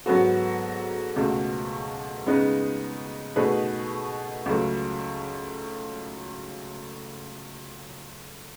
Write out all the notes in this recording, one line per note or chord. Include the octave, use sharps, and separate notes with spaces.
G#2 F#3 B3 F#4 A4
C#2 B2 A3
C#3 G#3 B3 D#4
B2 A3 D#4 G#4 B4
C#2 C#3 F#3 A3